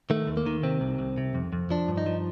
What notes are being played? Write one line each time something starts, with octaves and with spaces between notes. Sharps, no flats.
D#3 A3
D#2
A#3
D#3
C3 C4
C2
C2
C3
F2
F2
F3 D4
G2
D#4
F3